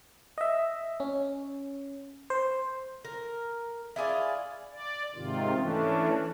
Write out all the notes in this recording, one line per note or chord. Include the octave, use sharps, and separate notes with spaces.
D#5 E5
C#4
C5
A#4
E4 F4 G#4 D5
D5
G#2 C3 D#3 F4
E3 A3 C#4 D4